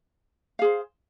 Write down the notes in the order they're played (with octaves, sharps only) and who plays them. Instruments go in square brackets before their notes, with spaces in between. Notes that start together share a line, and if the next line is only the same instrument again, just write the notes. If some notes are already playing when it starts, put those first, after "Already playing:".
[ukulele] F5
G#4
C5